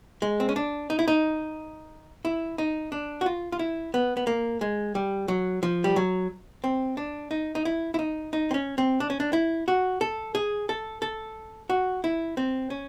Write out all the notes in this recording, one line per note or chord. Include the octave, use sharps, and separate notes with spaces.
G#3
C4
C#4
D4
D#4
E4
D#4
E4
D#4
D4
F#4
F4
F4
E4
B3
B3
A#3
G#3
G3
F#3
F3
G3
F#3
C4
D4
D#4
D#4
E4
E4
D#4
D#4
C4
C#4
C4
D4
C#4
D4
E4
F#4
A4
G#4
A4
A4
F#4
E4
C4
C#4